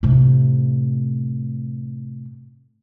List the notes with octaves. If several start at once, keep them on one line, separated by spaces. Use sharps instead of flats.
A2 C3